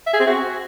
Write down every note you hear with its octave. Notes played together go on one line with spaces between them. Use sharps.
E5
G#4
C4
F#4